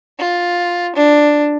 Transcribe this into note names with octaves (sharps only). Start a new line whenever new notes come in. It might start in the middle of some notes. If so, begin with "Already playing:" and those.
F4
D4